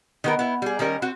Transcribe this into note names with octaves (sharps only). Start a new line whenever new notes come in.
D#3 B3 A#4
B3 E4
G3 G#4
D#3 G3 C#4 A#4
C4 F#4